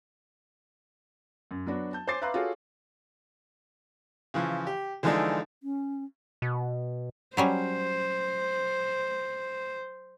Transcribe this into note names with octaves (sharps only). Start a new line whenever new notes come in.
F#2
F#3 B3 D4 F#4
A5 G6
C5 C#5 G#5 D6 A6 C7
B4 E5 F5 A#5 C6 F#6
F4 F#4 G#4 A4 C#5
C#3 E3 F3
G4
D3 E3 F3 G#3 D4 D#4
C#4
B2
F#3 G3 C#4 C5